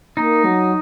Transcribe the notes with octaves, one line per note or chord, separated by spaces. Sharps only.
A#3 D#4
F#3